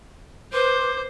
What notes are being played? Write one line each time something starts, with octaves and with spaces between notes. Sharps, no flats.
B4 C5 C6 D6 G6